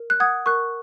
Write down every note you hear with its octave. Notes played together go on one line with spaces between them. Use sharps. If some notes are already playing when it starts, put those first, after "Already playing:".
Already playing: A#4
F#6
F#5 D#6 G#6
A#4 C#6 F#6